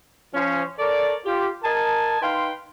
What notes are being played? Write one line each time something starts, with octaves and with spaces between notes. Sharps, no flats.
F3 C#4
A4 A#4 C#5 D5
F4 G4
A#4 D#5 G#5 A5
D#4 B4 F5 G5 C6